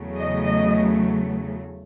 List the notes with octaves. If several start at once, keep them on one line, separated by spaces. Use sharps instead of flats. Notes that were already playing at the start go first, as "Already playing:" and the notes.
Already playing: E2 C#3 F#3 A3
D#5
D#5